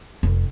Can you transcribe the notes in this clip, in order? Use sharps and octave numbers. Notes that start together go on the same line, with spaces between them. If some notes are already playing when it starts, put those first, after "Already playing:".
F1